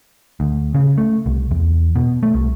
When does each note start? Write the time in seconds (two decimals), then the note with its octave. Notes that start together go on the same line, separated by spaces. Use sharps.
0.40 D2
0.75 C#3
0.98 A3
1.26 C2
1.51 E2
1.96 B2
2.23 A3
2.34 C2